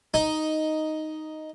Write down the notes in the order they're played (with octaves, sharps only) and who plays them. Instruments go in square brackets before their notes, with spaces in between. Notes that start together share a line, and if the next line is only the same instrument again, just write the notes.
[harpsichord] D#4